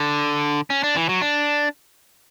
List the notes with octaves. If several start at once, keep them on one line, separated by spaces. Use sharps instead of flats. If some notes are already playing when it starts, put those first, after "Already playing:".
Already playing: D3
C#4
D4
E3
F#3
D4